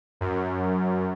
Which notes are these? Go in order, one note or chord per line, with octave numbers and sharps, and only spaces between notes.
F#2